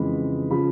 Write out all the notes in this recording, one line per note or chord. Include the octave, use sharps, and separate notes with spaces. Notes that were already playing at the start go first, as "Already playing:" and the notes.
Already playing: F2 C#3 E3 G#3 B5
C#3 F3 B5